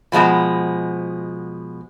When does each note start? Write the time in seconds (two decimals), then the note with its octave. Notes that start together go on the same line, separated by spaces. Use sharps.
0.12 B2 F3 G#3 B3 A#5